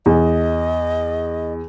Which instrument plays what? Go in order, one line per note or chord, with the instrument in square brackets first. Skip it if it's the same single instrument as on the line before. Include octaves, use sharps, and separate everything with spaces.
[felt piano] E2 [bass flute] D#5